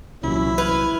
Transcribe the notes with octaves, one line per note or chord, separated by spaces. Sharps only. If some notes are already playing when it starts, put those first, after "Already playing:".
C2 A#2 E3 F#3 C#4 E4
B4 F6 G#6